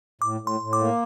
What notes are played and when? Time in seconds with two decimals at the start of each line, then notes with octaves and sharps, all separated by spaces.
0.22 A2 D6
0.41 A2
0.47 C6
0.60 A2
0.73 D6
0.80 A#3